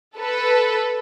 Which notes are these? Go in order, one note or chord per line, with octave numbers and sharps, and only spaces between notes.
A4 B4